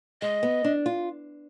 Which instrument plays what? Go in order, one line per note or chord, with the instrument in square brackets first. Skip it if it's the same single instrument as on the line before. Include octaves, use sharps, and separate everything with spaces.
[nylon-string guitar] G#3 [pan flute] D#5
[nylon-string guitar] B3
D4
F4